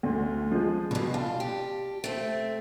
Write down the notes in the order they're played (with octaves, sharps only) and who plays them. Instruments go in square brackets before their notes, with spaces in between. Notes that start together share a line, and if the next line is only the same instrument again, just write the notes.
[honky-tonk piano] D2
F3 G#3
[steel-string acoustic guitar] G2 D3 [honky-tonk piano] B2
[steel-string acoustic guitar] F4 [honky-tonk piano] A5
[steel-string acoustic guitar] G4
A3 C4